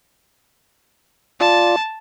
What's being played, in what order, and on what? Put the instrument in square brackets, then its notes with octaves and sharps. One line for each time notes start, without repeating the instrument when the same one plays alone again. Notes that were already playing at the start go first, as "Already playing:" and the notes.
[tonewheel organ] F4 D5 [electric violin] A5